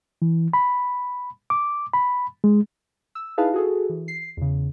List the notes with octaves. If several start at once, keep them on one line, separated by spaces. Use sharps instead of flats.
E3
B5
D6
B5
G#3
E6
D#4 E4 G#4 B4 F5 A5
F#4 G#4 A4
E3
C7
E2 C#3